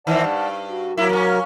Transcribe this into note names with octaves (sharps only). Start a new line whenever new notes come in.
D#3 E3 C4 D5 F#5 A5
G2
F#4
F#3 A#3 E4 A#4
A#3 C#4